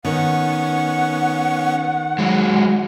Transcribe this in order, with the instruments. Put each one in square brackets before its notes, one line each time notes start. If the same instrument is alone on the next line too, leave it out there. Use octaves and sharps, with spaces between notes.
[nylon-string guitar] D#3 [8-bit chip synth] B3 C#4 C#6 [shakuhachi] F#5
[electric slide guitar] F#3 G#3